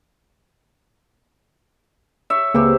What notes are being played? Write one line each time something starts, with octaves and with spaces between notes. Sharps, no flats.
C#5 E5
C#2 C3 A#3 G4 G#4 B4